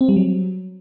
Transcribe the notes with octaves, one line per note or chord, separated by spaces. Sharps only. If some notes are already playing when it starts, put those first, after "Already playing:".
C4
G3
F#3